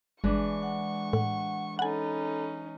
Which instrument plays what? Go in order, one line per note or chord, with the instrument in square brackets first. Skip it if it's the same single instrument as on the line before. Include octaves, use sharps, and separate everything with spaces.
[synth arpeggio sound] G1 [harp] E3 G#3 D4 [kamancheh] C#6
[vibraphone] F#5
[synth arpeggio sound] A2 [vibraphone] F#5
[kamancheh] C#4 D#4 [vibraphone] A4 B5 [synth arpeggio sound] F#5 G#5